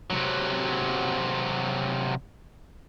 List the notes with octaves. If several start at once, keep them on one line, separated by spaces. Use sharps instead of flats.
C3 F#3